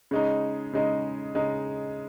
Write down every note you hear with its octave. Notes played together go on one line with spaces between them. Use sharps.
C#3 G#3 D#4
C#3 G#3 D#4
C#3 G#3 D#4